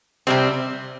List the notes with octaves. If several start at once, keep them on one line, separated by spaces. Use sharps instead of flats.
C3 G3 C4